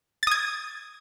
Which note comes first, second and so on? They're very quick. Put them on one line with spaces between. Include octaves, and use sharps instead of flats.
A6 D#6 G#6